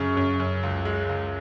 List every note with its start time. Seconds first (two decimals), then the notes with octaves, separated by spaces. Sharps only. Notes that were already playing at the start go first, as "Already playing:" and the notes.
Already playing: F#2 C#3 C#6
0.17 F#2
0.40 F#2
0.63 C#2
0.85 G#3
1.09 C#2